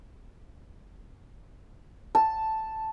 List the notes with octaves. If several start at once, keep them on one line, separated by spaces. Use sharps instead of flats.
A5